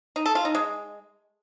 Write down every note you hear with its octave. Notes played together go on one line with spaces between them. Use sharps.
D#4
A4
F4
D#4
G#3